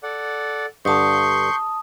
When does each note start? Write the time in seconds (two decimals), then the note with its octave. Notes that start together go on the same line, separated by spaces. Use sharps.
0.03 A4 D5 F#5
0.85 G2 D3 A5 C6 C#6 D#6 G6